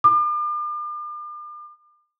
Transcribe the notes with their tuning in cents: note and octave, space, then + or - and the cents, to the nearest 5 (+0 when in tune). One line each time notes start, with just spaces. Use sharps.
D6 +40